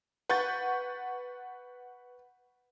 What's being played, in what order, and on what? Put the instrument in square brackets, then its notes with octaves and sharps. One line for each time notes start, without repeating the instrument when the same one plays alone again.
[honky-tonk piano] B4 F#5 C#6 G6 A6